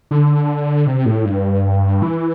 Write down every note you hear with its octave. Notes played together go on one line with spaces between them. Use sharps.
D3
C3
A2
G2
E3